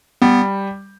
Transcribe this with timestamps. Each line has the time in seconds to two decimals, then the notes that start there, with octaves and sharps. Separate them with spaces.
0.22 G3 B3